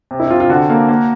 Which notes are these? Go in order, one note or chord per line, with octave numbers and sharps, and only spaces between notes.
C3
E4
C3 F4
F4
D3 F#4
A#3
A#3